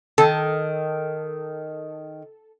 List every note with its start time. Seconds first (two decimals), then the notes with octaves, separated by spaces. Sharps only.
0.18 D#3 A4